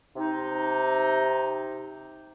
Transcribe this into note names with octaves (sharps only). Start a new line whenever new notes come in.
C3 D#4